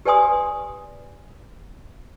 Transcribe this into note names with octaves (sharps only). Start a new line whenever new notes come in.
G4 B4 D5 G#5 C6 D#6